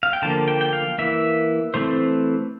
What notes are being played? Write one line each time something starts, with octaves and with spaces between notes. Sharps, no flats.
F5
G5
D3 F3 A#3 A5
G5
G5
F5
E3 A#3 E5
E3 A3 C4 C5